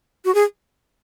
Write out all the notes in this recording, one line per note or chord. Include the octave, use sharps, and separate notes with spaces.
F#4
G#4